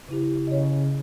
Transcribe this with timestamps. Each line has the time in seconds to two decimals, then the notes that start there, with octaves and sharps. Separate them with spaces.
0.08 C#3 E4 G4
0.47 C#3 C#5 D#5